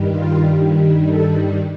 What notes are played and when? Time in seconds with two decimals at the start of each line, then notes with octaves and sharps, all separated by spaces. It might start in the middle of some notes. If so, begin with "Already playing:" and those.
Already playing: G2 D#3 G3
0.09 F4
1.08 A4